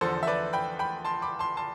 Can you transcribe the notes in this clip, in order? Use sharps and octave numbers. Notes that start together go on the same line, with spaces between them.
E2 D3 F3 A4 C5
E5
B4 D5
G5 B5
G5 B5
A5 C6
B5 D6
A5 C6
A5 C6